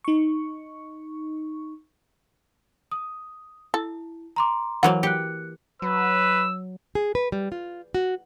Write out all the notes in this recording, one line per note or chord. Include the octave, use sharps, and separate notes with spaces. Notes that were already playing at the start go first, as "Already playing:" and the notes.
D#4 C#6
D#6
E4 A4
A#5 C6 D6
E3 F#3 A#3 C5 F#5
G4 F#6 C#7
F#3 B4 E6
G#4
B4
G3
F4
F#4